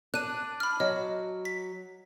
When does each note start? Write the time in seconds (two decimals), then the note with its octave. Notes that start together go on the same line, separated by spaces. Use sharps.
0.14 D4 F#6 D#7
0.60 B5 F6
0.80 F#3 D#5
1.45 B6